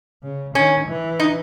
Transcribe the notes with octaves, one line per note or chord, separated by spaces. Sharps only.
C#3
D#3 C#4
E3
D#4